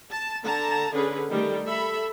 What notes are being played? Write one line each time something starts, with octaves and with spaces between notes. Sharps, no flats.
A5
D3 A5 A#5
D3 C#4 G#4 B4
D#3 G3 A3
A4 E5 B5